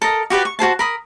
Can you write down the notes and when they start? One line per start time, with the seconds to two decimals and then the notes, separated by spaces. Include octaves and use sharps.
0.02 A4 A#4 D#5
0.30 F#4 G4 B4 D5
0.45 C#6
0.59 F#4 G#4 C5 A5
0.79 A#4 B5 D#6